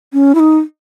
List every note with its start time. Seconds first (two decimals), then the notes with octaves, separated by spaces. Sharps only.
0.13 C#4
0.35 E4
0.40 D#4